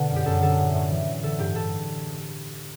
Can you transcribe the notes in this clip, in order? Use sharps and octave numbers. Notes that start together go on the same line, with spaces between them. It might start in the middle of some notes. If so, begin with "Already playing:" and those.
Already playing: B2 D3 B4
F#2
G4
F#2 A4
D3 A4
A2
A2
E3
E3
D3 A4
G2 G4
G2 A4